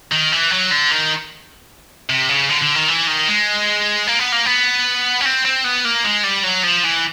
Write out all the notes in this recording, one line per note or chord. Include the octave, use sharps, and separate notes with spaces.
D#3
E3
F#3
D3
D#3
C3
C#3
D3
D3
D#3
E3
D#3
G#3
A#3
B3
A#3
B3
C#4
C4
C4
B3
A#3
G#3
G3
F#3
F3
E3